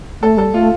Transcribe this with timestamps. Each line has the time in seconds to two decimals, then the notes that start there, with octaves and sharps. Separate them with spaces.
0.21 A3 A4
0.37 G3 A4
0.54 A3 F4